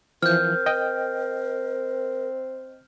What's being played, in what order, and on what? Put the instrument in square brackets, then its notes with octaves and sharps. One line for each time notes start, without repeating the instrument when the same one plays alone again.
[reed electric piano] E3 F3 [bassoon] C4 [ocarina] A#4 [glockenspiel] F6 G6
[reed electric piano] D#5 G5